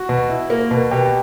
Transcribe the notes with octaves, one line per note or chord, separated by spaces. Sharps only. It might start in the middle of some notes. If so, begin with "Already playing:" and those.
Already playing: F#4
B2
E4
A#3
B2
B2 G4